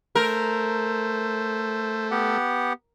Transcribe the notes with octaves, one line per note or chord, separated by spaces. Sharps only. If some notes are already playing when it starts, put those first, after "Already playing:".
A3 A#4 C5
B3 G4 F#5